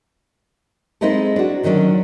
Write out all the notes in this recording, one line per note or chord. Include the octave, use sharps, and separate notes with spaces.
G#3 C4 D#4 E4 G#4 A4
D4 F#4
D3 D#3 F#3 C#4 D4